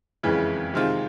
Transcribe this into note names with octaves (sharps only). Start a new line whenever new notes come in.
F#1 F2 C#3 E3 G#3
C3 D#3 G#3 C4 F4